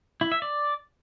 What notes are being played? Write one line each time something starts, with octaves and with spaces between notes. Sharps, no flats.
E4
E5
D5